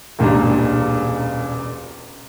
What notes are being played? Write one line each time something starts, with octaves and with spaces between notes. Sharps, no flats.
E1 C#2 A#2 G3 D4 A#5